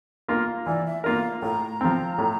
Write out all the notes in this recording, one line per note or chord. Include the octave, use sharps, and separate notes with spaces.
A#3 F4 A#4
E3 D5
E5
A#3 F4 A#4 F5
A2 A#5
F3 C4
A2